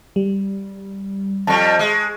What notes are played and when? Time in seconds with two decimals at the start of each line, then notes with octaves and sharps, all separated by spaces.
0.16 G3
1.47 F2 G3 A5 C#6
1.79 G#3